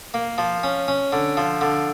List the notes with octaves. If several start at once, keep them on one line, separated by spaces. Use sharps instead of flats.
A#3
F3
C#4
C#4
D3
F3
D3